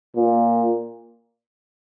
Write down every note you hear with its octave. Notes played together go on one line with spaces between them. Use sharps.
A#2